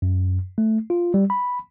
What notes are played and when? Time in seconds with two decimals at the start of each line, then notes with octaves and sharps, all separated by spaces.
0.02 F#2
0.58 A3
0.90 F4
1.14 G3
1.30 B5